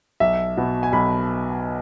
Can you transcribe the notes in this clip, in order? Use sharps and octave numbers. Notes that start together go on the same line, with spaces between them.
B1 E5
B2 B3
G#5
B1 B5